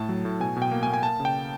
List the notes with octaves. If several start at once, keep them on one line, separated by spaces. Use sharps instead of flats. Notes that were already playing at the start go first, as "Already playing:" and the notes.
Already playing: A2 A3 A5
F#3
A2
B2 G#5
B2
G5
A#3
G#5
A#3
G#5
A#3 A5
C#3
G5